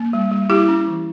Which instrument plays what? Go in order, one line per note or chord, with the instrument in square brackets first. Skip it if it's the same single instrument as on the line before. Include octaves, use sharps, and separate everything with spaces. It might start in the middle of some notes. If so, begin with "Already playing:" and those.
Already playing: [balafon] A#3
G3
G3
G3 E4 G4
C#4
E3